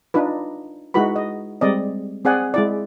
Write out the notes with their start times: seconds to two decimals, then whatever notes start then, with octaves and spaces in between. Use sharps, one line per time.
0.14 D4 D#4 F4 B4
0.94 G#3 D#4 E4 F#4 B4 B5
1.16 D#5
1.61 G3 G#3 C4 D5 D#5
2.25 C4 G#4 D5 F#5 G#5
2.54 G#3 E4 D5